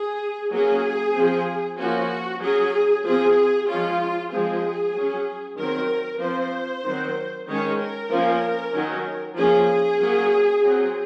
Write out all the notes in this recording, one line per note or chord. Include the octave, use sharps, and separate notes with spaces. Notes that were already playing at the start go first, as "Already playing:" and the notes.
Already playing: G#4
F#3 A#3 C#4 G#4
F3 C4
F3 A#3 C#4 F#4
F#3 C#4 G#4
F3 C4 G#4
F3 G#3 C#4 F4
F3 G#3 C4 G#4
F#3 C#4
D#3 F#3 C4 A#4
F3 C4 C5
D#3 F#3 C4
D#3 G#3 C#4 C#5
A#4
F3 A#3 C#4
D#3 F#3 C#4
F3 A#3 C#4 G#4
F#3 A#3 C#4
F#3 C4